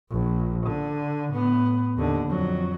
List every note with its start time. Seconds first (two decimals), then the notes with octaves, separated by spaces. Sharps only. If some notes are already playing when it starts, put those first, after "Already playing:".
0.11 A#1
0.66 D3
1.32 A2 B3
1.97 D#2 D3
2.28 F2 F#3